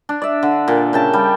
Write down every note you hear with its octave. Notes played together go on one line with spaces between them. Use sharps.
D4
D5 E5
D3
A#2
C#3 G5 A5
G3